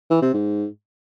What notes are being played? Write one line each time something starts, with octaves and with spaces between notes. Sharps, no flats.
E3
C3
G#2